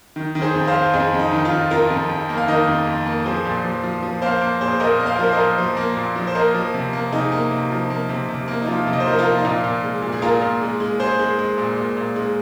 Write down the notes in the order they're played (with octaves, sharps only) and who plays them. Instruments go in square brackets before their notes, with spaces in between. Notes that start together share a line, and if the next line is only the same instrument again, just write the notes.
[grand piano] D#3
D#3
G#4 C5
F2
C5 F5
F2
F2 D#4 G#4
F2
D#4
D#3
F4
F2
F2 F4 A#4
F2
F2
A#3
F5
D#3 A#4 D#5
F2
F2
A#3
F3 G#4 C5
A#2
F3
F3
F3
A#3 C5 F5
A#3
A#2 G#4 C5
A#2 A#4 D#5
A#3
C5 F5
A#4
F3 C5
A#4 D#5
A#2
F3
A#3
A#2
F3
C5
A#3 A#4 D#5
F3
C3
A#3
C3 D#4 G#4
A#3
C3
F3
A#3
C3
C3
A#3
D#4
F3 F4
C3
D#5
C5
F3 A#4 D#5
F4 A#4
A#3
D#4
A#2 F4
A#2
G#3
A#2
G#4
A#2 F4 A#4
A#2
G#3
G#3
G#3 G#4 C5
G#3
G#3
A#2
A#2
A#2
G#3